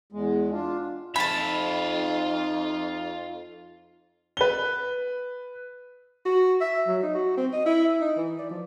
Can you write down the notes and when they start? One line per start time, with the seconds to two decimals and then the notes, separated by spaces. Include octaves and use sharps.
0.12 E2 G#3
0.52 D4 F4
1.16 F2 D#4 F4 E5 A5 B5
4.37 B4 G7
6.25 F#4
6.60 E5
6.87 F#3
7.03 D#4
7.15 F#4
7.37 C4
7.53 D#5
7.66 E4
8.01 D#4
8.17 E3
8.39 D5
8.51 F3